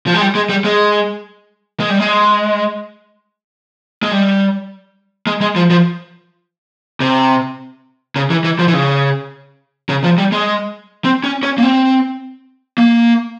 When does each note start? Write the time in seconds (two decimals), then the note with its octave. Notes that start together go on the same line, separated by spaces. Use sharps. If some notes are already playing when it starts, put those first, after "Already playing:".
0.07 F3
0.14 G#3
0.21 G3
0.35 G#3
0.50 G3
0.64 G#3
1.80 G#3
1.89 G3
1.99 G#3
4.03 G#3
4.11 G3
5.27 G#3
5.41 G#3
5.56 F3
5.70 F3
7.00 C3
8.16 C#3
8.30 E3
8.44 E3
8.59 F3
8.68 E3
8.74 C#3
9.89 C#3
10.04 F3
10.18 G3
10.32 G#3
11.05 C4
11.24 C#4
11.43 C#4
11.58 A#3
11.63 C4
12.78 A#3